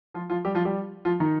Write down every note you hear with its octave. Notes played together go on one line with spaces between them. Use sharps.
F3 F4
F3 F4
G3 G4
F3 F4
G3 G4
F3 F4
D#3 D#4